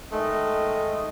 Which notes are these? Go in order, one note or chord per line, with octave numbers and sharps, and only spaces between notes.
D#3 G#3 A3 D#5